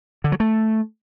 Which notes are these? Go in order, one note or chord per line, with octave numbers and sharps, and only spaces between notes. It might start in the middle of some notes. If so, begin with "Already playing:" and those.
D3
F#3
A3